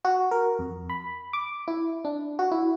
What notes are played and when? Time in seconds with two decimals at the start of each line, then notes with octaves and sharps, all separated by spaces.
0.05 F#4
0.31 A#4
0.59 F2
0.90 B5
1.33 D6
1.68 E4
2.05 D4
2.39 F#4
2.51 E4